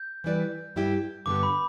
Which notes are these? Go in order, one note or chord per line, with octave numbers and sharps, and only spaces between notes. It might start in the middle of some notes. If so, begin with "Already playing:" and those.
Already playing: G6
E3 G3 E4 B4 D5
G2 G3 E4 G4
G2 D3 B3 G4 D6
D6
B5